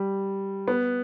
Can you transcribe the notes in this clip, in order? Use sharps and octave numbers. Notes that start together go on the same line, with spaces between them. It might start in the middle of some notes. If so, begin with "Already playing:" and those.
Already playing: G3
B3